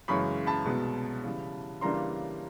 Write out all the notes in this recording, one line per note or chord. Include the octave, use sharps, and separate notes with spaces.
F#2 C#3 E3 G#3 B5 C#6
A5 B5
C2 B2 G#3 B3
C#3 E3 G3
C#3 E3 G3 A#3 D4 A#5 C6